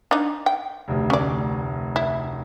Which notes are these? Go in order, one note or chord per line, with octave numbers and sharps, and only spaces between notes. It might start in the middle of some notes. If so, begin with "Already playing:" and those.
D4 D#4
G5
F1 D2
C#4 D5
E4